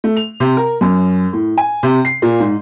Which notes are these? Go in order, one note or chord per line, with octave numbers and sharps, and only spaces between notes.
A3
F7
C3
A#4
F#2
A2
G#5
C3
C7
A#2
G#2